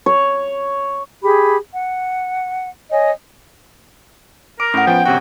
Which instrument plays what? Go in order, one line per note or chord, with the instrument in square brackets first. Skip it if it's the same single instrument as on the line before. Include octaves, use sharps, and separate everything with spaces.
[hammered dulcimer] C#5
[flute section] G4 G#4 B5
F#5
C#5 D#5 G#5
[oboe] A#4 [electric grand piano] D6 [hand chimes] D7
[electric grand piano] A2 [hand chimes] C#4 F#5
[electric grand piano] F3 B3 [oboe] G5
[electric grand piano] G1 C3 G5 [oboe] F#4